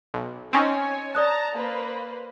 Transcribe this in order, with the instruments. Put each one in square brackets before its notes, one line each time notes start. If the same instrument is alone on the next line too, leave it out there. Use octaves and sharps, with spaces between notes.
[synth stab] B1
[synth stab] C4 C#4 D#4 [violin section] C#5 G#5
[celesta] D5 D#6 F#6 [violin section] A5 A#5
[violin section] A#3 B4 C5